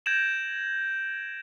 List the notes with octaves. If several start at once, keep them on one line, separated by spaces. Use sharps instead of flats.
G6 G#6 A#6 D7 E7 F#7